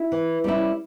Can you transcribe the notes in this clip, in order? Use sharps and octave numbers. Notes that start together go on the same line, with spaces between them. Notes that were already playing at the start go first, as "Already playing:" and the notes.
Already playing: E4
E3
G3 C#4 E4